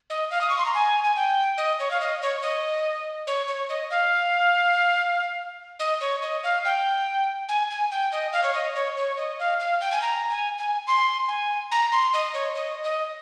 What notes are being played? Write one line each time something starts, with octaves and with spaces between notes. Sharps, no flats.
D#5
F5
D#6
C#6
C6
A#5
G#5
G#5
G5
D#5
C#5
F5
D#5
C#5
D#5
C#5
C#5
D#5
F5
D#5
C#5
D#5
F5
G5
G#5
G#5
G5
D#5
F5
C#5
D#5
C#5
C#5
D#5
F5
F5
G5
G#5
A#5
G#5
G#5
C6
G#5
A#5
C6
D#5
C#5
D#5
D#5